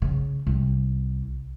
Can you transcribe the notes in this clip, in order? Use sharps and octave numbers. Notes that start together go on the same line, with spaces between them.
C#3
C2